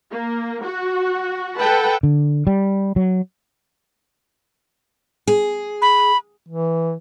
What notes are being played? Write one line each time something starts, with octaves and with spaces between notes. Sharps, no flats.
A#3
F#4
A4 B4 F#5 G5 A5 B5
D3
G3
F#3
G#4
B5
E3